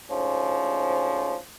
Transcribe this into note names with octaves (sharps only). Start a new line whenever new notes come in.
D2 G#2 F3 C#4